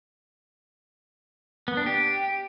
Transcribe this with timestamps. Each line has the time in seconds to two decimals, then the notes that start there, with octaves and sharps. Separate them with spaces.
1.68 B3
1.77 D4
1.86 G4